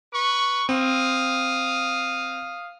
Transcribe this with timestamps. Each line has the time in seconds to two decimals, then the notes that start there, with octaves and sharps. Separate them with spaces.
0.13 B4 C#6
0.69 C4 F5 D#6